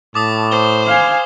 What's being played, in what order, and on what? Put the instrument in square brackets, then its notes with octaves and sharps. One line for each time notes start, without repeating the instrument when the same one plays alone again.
[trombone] A2 [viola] A5 [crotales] D6 D#6
[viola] C5 [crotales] G7
[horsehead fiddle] F5 G#5